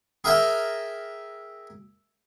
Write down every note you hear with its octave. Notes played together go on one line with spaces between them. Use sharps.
G#4 A#4 E5 G5 G#5 A#5